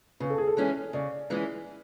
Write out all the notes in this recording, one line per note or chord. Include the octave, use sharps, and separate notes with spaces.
C#3 B4
A4
G#4
A4
E3 G#3 C#4 E4
C#3 D5
E3 G#3 C#4 E4